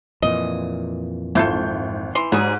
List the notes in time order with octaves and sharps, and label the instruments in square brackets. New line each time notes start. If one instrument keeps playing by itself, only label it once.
[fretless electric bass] F2 A#2 E3 [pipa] D#5
[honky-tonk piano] G#1 G6 [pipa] E4 F4 A4
[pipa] E3 C6
[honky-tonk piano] G#2 [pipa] F#3 G3 G#4